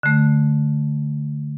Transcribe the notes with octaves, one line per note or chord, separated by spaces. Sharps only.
D3 A3